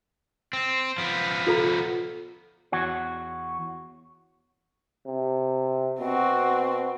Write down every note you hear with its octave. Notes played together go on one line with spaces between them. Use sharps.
C4
F3 B3
F4 A4 A#5
E2 F#4 C#5
C3
B2 C4 F#4